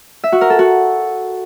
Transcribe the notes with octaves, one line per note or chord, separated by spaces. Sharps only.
E5
F#4
A#4
A4
F#4